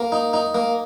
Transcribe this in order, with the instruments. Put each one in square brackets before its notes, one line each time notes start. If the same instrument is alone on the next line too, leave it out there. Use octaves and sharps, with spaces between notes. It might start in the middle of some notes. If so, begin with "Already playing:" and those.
Already playing: [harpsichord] A#3
D#4
D#4
A#3